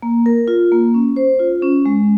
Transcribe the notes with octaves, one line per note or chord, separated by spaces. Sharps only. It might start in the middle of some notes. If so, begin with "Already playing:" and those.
A#3
A#4
F4
A#3
C#4
C5
F4
C#4
G#3